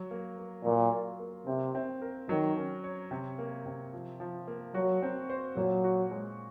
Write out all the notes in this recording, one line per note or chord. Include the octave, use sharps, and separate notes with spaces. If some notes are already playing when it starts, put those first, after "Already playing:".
Already playing: F#3
A#3
A#3
A#2 F#3
F4
A#3
C3 C4
C4
A#4
D#3 F#3
C#4
C#5
C3
A#3
C3
F3
F3
A#3
F#3 F#4
C4
C5
A#2 F#3
F#4
G#3